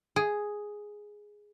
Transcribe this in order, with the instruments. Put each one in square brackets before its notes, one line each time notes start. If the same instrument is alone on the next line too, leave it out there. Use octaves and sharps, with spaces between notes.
[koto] G#4